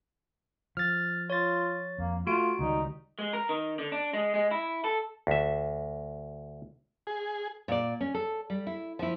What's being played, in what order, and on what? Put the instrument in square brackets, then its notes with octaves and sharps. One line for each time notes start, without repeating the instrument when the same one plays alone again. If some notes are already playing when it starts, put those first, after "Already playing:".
[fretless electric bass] F3 [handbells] F6 A6
[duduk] F4 [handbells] C#5 A6
[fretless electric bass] F2 [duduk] A#3
[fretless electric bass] A3 [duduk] F4 [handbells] F#4 D7
[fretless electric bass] C#2 D#3 G3 [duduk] D#4
[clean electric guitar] G#3
A#4
D#3
D3
D4
G#3
G#3
E4
A4
[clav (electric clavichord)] D2 E5
[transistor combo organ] G#4
[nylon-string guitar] A#2 D5
C#4
A4
G3
E4
F3 E4